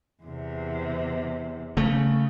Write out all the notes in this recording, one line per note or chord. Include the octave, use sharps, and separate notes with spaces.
E2 C3
C#3 A3